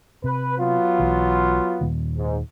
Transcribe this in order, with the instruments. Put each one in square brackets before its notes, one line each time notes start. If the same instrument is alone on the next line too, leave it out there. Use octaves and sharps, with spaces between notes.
[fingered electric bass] C3 [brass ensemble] B4
[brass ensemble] F#3 B3 F4
[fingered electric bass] B1 E3
D#2 A#2 D#3
[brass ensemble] G#2